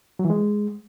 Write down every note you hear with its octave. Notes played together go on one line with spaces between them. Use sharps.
F#3
E3
G#3